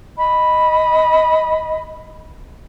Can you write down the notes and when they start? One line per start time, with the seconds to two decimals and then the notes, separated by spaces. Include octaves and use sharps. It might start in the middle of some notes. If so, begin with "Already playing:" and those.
0.18 D#5 B5